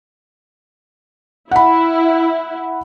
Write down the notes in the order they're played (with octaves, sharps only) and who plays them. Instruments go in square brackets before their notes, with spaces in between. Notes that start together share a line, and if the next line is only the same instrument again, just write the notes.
[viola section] E4 [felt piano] F#5 B5